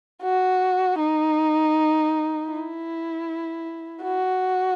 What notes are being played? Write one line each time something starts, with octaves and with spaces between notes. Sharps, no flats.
F#4
D#4
E4
F#4